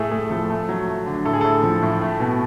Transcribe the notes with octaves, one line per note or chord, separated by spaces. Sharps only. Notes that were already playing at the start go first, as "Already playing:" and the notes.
Already playing: A2 A3 G#4 A4
A3 G#4
F3 A4
A3
F#3
A3
D3
A2 A4
G#4
A2 A4
F3
A2
A3
B2